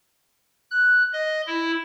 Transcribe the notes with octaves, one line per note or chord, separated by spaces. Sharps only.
F#6
D#5
E4